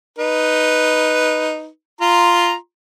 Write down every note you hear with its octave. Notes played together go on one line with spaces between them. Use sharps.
D#4 B4
F4 A#5 C6